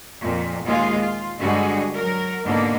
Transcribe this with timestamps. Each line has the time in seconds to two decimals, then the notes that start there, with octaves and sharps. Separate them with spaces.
0.20 F2 A#2
0.65 D#2 G#3 F4 G#4 F5
0.99 F4
1.38 G2 D3 G3 G#3 F#4 G#4
1.95 F#3 A#4
2.44 G#2 B2 D3 A#3